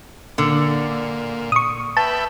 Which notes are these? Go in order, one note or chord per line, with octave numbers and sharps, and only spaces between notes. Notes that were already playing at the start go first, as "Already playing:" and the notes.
A#2 D3
C#6 D#6
B4 E5 G5 A5